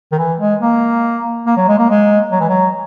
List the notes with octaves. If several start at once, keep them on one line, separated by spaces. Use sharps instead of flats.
D#3
E3
G#3
A#3
A#3
F#3
G#3
A#3
G#3
F#3
E3
F#3